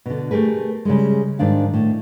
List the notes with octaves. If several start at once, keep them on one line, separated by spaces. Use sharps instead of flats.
B2 D3
A3 G4 G#4 A#4 B4
C#3 G3 G#3
G#2 D#3 D4 F5
A2